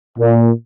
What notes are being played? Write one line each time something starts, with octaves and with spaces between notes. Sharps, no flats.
A#2